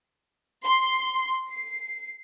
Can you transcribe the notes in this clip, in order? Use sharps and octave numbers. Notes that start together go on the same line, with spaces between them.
C6
C7